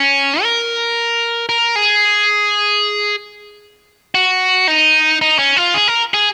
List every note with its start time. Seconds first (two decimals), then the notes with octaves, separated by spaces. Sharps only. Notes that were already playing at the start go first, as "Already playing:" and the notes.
Already playing: C#4
0.42 A#4
1.49 A#4
1.76 G#4
4.15 F#4
4.68 D#4
5.22 D#4
5.39 C#4
5.57 F4
5.74 G#4
5.88 A#4
6.14 G#4